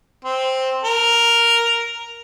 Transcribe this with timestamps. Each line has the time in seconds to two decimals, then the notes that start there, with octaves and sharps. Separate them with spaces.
0.25 C4
0.83 A#4